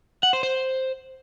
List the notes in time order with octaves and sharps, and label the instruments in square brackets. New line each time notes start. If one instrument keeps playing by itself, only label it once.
[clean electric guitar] F#5
C5
C5